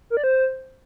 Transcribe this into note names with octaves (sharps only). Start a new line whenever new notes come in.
A#4
D5
C5